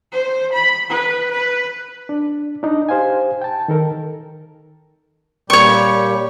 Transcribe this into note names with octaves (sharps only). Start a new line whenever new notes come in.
C5
B5
B4
B4
D4
D4 D#4
G4 C5 F5 G#5
G5 A5
D#3 A4 A#4
A#2 G3 G4 C#5 C#6